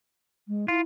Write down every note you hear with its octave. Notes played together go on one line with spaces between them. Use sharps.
G#3
E4 F4